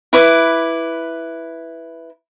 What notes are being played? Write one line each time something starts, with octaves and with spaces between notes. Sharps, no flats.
E4 B4 D6